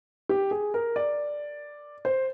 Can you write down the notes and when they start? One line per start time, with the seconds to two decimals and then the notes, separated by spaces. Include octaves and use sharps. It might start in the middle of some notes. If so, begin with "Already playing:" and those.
0.29 G4
0.51 G#4
0.74 A#4
0.96 D5
2.05 C5